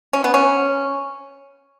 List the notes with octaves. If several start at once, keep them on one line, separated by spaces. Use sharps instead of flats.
C#4
B3
C#4